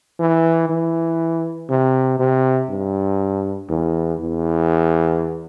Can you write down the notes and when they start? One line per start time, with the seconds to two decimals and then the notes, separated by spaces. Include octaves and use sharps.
0.19 E3
0.69 E3
1.70 C3
2.19 C3
2.69 G2
3.69 E2
4.19 E2